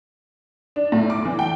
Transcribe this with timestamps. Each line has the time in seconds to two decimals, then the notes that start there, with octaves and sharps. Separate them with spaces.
0.76 D4
0.92 A2
1.10 D6
1.25 E3
1.39 G5